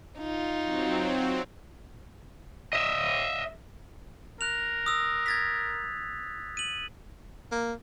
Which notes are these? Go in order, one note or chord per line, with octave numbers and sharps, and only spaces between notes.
D#4 F4
F#3 C4
D#5 E5
A#4 F#6 F7
D#6 E6
G#6 A6 B6
D#7 F#7
A#3